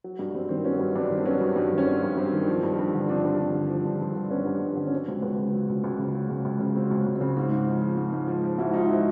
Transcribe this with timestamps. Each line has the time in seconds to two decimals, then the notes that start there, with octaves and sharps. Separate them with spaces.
0.04 F#3
0.19 G2
0.35 G2 C4
0.49 D#3 C4
0.65 F#3 B3 C#4
0.80 G2
0.95 G2 C4 D4
1.10 D#3
1.18 C4
1.25 F#3 B3 C#4
1.41 G2
1.56 G2
1.72 D#3
1.78 C#4
1.87 F#3 C4
2.03 G2
2.17 G2 C4
2.33 D#3
2.47 F3
2.63 G2
2.79 G2
2.94 D3
3.08 F3 C4 D4
3.25 G2
3.39 G2
3.55 D3
3.70 F3
3.85 G2
4.01 G2
4.15 D3
4.31 F3 B3 C#4
4.46 G2
4.62 G2
4.77 D3
4.87 C#4
4.92 F#3 C4
5.08 C#2
5.22 C#2 B3
5.38 C#3
5.53 F#3
5.69 C#2
5.84 C#2
5.99 C#3
6.14 F#3
6.30 C#2
6.45 C#2
6.60 C#3
6.76 F#3 C4
6.91 C#2
7.06 C#2
7.16 C4
7.21 C#3
7.36 G#2 C4
7.52 G#2
7.67 F3
7.82 F3
7.97 G#2
8.13 G#2
8.28 F3
8.44 F3
8.58 G#2 E4 F#4
8.73 G#2 D#4 F4
8.89 F3 E4 F#4